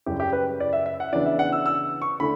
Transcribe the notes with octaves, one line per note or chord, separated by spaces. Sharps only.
F#2 C#3 G3 G4
G4
B4
D5
E5
E5
F#5
C#3 E3 B3 D4 D5
E5
F#5
E6
E6
C#6
D3 A3 C#4 B5